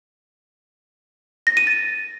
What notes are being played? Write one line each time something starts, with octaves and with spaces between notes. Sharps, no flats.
A#6
D#7
A6